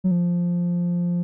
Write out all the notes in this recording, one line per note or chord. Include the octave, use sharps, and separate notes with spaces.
F#3
F3